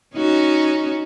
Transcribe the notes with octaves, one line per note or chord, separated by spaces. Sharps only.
C#4 D#4 F#4